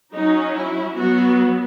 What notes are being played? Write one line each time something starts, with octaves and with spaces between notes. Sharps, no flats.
F#3 C#4 D#4
E4
F#3 B3 F#4